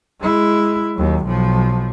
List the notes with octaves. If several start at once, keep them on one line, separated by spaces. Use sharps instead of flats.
G#3 E4
D#2 F#3
B1 F3